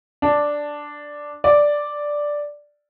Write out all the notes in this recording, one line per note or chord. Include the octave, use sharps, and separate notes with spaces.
D4
D5